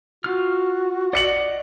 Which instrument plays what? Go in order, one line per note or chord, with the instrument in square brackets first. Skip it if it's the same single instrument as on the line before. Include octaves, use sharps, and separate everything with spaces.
[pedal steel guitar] F4 F6 [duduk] F#4
[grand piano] D5 C#7 F#7 [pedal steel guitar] D#5 F#5